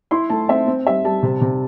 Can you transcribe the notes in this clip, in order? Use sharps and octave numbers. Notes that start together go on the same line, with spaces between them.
E4 C6
A3 A5
C4 E5
C4
G3 E5
G3 A5
C3
C3